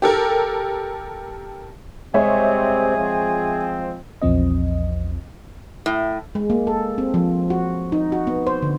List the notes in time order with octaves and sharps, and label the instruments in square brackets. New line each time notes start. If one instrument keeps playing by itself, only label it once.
[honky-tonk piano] G4 A4 A#4
[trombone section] C3 G3 C4 [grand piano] G#3 [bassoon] G#4 [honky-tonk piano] C#5 E5
[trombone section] F3 C4
[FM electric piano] A#1 E2 F3 C4 D#5
[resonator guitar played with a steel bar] A2
[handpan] G#3
A#3
A4
C4
F3
F#4
D#4
F#4
B3
C5
D3